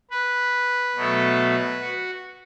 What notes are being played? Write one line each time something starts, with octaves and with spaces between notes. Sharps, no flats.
B4
B2 F#3 A3
F#4